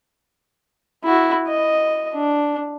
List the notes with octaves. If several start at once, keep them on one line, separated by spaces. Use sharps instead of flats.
E4 F#4
D#5
D4